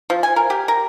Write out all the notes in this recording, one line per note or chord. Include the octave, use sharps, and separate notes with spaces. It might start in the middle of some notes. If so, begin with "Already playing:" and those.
F3
G#5
A#4
G4
A#4